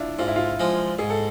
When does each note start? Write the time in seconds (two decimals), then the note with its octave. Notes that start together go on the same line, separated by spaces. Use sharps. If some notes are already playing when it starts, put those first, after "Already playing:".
Already playing: D4 E4 F4
0.19 G#2 F4
0.28 E4
0.36 F4
0.60 F3 G#3
0.99 G#2 G#4
1.10 A4